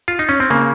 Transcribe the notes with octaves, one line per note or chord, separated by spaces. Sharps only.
F4
D#4
C#4
C4
C#3 A#3